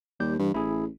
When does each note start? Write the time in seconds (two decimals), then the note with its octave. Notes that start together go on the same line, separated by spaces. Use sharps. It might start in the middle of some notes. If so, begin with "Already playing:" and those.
0.20 D#2 G3 G4 G6
0.39 G2 E3
0.54 A1 E4 G#4